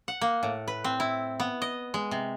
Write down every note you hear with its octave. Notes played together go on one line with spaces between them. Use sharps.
F#5
A#3
A2
B4
C4
E4
B3
D#5
G#3
C3